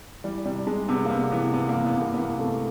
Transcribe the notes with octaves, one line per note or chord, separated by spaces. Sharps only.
E3 G3
C3 G3
C3 G#3
C3 B3
A#3
C3 B3
E3 B3
C3 B3
A#3
E3
B3
C3 A#3
B3
E3 A#3
C3 A3